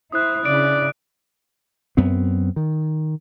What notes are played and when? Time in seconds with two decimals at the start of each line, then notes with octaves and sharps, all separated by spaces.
0.12 E4 C5 D#6 F#6
0.45 C#3 D4 E4 D5 D7
1.97 F#2 B3 C4
2.56 D#3